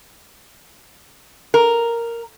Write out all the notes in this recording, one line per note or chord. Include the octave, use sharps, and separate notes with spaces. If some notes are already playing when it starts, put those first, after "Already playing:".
A#4